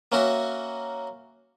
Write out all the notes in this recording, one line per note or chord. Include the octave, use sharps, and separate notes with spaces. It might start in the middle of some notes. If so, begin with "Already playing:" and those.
A#3 C#4 F#4 A#4 E5